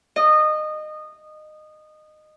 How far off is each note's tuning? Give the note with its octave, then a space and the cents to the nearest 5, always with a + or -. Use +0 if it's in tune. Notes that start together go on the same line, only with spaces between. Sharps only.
D#5 -20